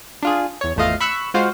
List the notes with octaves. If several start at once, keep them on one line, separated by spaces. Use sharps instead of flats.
D4 F4 G#4
E2 C#5
G#1 E2 A3 F4 D#5 F5
B5 C#6 E6 F#6
G#3 F4 F#4 C5 F5